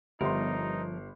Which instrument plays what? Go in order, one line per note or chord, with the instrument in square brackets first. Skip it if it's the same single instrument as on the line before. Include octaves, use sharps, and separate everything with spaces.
[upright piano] G1 C6 [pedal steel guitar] F3 A#4 [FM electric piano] G3 B3 [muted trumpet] D#4